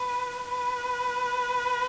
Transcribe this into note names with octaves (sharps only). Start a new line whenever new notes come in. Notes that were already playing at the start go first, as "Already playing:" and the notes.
Already playing: B4
B4